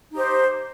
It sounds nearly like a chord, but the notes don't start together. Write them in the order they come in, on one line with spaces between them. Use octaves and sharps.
D#4 G4 C5